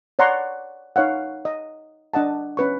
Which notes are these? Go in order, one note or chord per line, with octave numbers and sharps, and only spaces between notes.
C#5 D5 F#5 A#5 C6
D#4 C#5 F5 F#5
D#5
D4 D#5 F#5 A5
C#4 B4 C#6